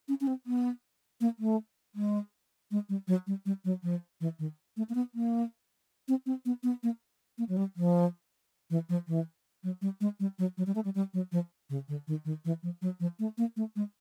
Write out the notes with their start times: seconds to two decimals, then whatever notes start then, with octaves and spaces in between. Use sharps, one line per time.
0.08 C#4
0.21 C#4
0.27 C4
0.46 B3
1.21 A#3
1.39 A3
1.95 G#3
2.71 G#3
2.89 G3
3.08 F#3
3.27 G3
3.46 G3
3.65 F#3
3.83 F3
4.21 E3
4.39 D#3
4.77 A3
4.89 A#3
4.95 B3
5.15 A#3
6.08 C4
6.26 C4
6.46 B3
6.63 B3
6.83 A#3
7.38 A#3
7.49 F#3
7.57 G3
7.76 F3
8.70 E3
8.89 F3
9.08 E3
9.64 F#3
9.82 G3
10.01 G#3
10.20 G3
10.39 F#3
10.58 F#3
10.66 G3
10.75 A3
10.85 G3
10.95 G3
11.14 F#3
11.32 F3
11.70 C#3
11.88 D3
12.08 D#3
12.25 D#3
12.45 E3
12.63 F3
12.82 F#3
13.00 F3
13.19 A3
13.38 A#3
13.56 A3
13.76 G#3